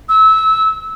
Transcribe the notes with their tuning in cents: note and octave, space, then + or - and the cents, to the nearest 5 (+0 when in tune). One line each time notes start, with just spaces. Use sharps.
E6 -20